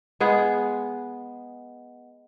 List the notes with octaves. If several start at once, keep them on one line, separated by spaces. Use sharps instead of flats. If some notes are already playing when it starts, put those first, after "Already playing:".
G#3 B3 G#4